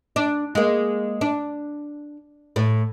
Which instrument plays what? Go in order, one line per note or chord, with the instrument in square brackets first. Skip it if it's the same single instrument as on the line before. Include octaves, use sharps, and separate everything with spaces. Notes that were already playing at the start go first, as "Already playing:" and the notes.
[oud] D4
G#3 A#3
D4
A2